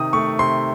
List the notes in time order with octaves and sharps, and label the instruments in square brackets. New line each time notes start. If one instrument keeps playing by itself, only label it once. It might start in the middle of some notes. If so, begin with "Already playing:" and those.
Already playing: [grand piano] C3 D#3 D#6
A3 C#6
C3 C6